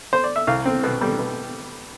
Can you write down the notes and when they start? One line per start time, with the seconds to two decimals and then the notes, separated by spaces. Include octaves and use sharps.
0.13 C5
0.24 D5
0.36 E5
0.47 C2 F5
0.65 C4
0.83 B2
1.01 G3
1.19 B2